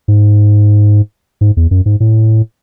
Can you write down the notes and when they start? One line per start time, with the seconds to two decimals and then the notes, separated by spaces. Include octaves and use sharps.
0.08 G#2
1.41 G#2
1.57 E2
1.71 F#2
1.86 G#2
2.00 A2